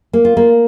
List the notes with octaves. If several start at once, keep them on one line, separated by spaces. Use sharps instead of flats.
A#3
F4
A#3